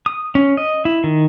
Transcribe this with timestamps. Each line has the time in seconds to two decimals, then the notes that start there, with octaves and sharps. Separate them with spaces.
0.06 D#6
0.35 C#4
0.57 D#5
0.85 E4
1.04 D#3